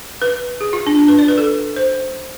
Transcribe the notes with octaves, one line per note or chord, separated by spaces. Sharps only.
B4
G#4
F4
D4
D4
B4
D5
B4
A4
C5